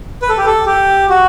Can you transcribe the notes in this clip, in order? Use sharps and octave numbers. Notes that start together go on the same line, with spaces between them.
B4
A4
G4
A4
G4
F#4